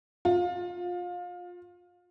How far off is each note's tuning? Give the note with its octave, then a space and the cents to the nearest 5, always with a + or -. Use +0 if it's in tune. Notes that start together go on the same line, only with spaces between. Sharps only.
F4 +25